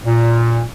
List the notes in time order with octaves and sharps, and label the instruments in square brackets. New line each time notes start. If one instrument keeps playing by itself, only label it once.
[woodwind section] A#2